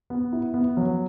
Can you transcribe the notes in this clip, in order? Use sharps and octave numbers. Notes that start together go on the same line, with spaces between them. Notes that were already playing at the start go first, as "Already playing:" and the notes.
B3
E4
B3
F#3